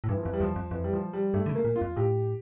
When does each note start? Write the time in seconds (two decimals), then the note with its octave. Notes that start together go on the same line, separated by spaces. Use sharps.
0.04 A2
0.09 G2 E3
0.17 F3
0.23 F2 E3
0.33 G3
0.40 E2 F3
0.56 F2
0.71 F2 E3
0.84 G3
0.93 F3
1.13 G3
1.34 G2 A3
1.46 D3
1.49 C#3
1.55 A#3
1.65 A#2
1.76 F4
1.81 F2
1.96 A2 G4